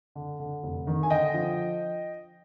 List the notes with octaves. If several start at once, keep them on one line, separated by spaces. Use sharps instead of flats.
D3
D3
F1
D#3
G#5
D3 D#5 G5
F3